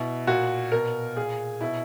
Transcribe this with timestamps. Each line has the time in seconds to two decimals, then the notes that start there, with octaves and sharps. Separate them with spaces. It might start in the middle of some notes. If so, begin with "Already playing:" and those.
Already playing: B2 E4
0.27 A#2 F#4
0.72 B2 A#4
1.16 A#2 G#4
1.61 B2 E4